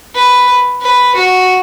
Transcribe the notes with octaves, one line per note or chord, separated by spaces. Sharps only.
B4
B4
F#4